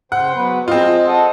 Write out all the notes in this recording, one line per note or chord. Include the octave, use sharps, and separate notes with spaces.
C#3 C5 F#5 G5
F#3 B3 B4
F3 G#3 C4 F4 D#5
A4 D#5 F#5